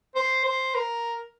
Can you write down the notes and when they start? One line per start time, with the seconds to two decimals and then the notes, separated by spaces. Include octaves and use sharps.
0.15 C5
0.45 C5
0.75 A#4